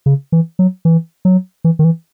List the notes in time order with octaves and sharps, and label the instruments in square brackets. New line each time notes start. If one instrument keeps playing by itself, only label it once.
[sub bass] C#3
E3
F#3
E3
F#3
E3
D#3
E3